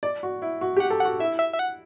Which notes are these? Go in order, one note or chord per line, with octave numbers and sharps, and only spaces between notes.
D5
F#4
E4
F#4
G4
F#5
A4
F#5
F#4
E4 E5
E5
E5
F#5